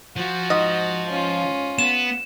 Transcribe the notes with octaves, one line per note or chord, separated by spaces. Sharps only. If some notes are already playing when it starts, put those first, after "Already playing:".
F3 F#4
G#2 D#5
C#4 F4
B3 E7